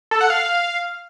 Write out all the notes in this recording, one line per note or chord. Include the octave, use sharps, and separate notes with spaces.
A4
F#5
F5